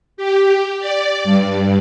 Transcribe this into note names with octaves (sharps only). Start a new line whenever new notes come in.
G4
D5
G2